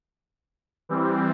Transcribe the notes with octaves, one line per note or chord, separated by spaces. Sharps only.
E3 G3 C4